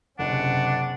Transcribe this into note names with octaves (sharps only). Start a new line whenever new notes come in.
F#1 C3 C#4 D4 F#5